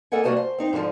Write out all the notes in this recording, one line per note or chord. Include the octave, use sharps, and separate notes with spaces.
A#3 A4 A#4 D#5 F#5 G#5
G3 A#3 F#4 C5 D#5 A5
C5
C4 D#4 C5
G#2 D3 D#3 F3 D#5